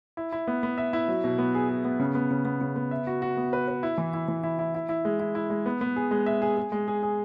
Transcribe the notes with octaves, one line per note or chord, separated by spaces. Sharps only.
E4
E4
B3
B3
E5
E4
F#3
B2
B3
G#4
G#4
B3
C#3
B3
C#3
B3
C#3
B3
E5
F#4
F#4
B3
B4
B4
E4
E3
E4
E3
E4
E4
E4
E4
G#3
E4
E4
G#3
B3
B3
G#4
G#3
E5
G#4
G#4
G#3
G#4
G#4